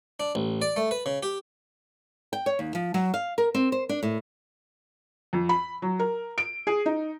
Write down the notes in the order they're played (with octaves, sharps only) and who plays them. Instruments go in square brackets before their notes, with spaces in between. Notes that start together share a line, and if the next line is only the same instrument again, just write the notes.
[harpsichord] D4
A1
D5
A3
B4
C#3
G4
[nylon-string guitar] G5
C#5
D#2
F3
F#3
F5
A#4
C4
C5
D4
A2
[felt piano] F2
B5
F#3
A#4
D7
G#4
D#4